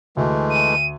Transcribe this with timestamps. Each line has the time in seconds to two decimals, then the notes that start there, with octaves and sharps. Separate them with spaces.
0.17 D2 E3 G#3 A3
0.52 D#7